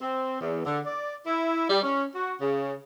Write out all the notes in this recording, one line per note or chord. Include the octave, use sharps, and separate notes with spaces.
C4
E2
D3
D5
E4
G3
C#4
F#4
C#3